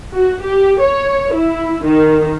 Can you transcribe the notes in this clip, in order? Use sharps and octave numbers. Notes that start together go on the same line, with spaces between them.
F#4
G4
C#5
E4
D#3